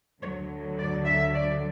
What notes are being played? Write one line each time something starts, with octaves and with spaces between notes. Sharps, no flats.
D2 D3 F#3 C#5
D5
E5
D5